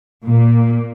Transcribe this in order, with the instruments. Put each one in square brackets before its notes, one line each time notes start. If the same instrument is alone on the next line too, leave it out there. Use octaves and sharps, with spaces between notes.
[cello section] A#2 A#3